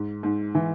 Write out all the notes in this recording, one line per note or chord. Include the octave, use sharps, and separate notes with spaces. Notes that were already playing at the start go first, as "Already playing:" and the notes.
Already playing: G#2
G#2
E3